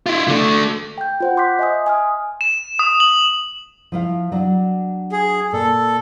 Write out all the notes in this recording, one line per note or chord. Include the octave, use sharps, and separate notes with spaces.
E4 F4
D3 A3
G5 G6
F4 C5 F#5
C6 D6 F#6 G6 B6
D#5 E5 G#5 C6 D#6
G#5 D#6 F6
E7
D#6
F#7
F3 E4 F5
F#3 D4
G#4
A#2 A4